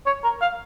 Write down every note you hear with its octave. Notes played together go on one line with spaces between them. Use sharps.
C#5
A#4
F5